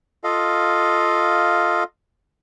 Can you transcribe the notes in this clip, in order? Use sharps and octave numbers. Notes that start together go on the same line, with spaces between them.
F4 A4 D#5 F5